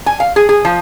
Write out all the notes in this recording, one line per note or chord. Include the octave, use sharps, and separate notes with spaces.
G#5
F5
G#4
G#4
F3